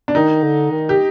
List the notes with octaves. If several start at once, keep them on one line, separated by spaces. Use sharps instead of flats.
D4
D#3 D#4
D3
D#3
G4